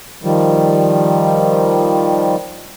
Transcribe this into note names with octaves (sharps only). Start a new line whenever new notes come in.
D#3 F3 G3